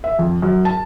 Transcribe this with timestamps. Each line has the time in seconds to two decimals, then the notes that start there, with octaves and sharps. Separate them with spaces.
0.04 E5
0.19 F2
0.42 F#2
0.65 A5